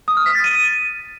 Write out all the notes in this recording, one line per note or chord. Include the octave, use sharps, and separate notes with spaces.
D#6
F6
B6
A6
D#7